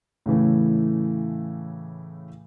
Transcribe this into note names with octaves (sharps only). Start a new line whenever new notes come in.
A2 C#3 E3 A3